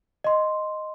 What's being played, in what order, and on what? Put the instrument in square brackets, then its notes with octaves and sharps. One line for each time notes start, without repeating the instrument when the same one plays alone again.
[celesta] D#5 C6